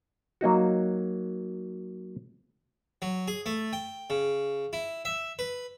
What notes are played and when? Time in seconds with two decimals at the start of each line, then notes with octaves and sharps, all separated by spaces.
0.41 F#3 A#3 D#4 F#4
3.02 F#3
3.28 G#4
3.46 A3
3.73 G5
4.10 C#3
4.73 E4
5.05 E5
5.39 B4